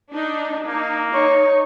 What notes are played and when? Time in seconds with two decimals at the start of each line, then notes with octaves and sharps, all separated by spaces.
0.11 D4 D#4
0.66 A#3 D#4
1.14 D#4 C#5 C#6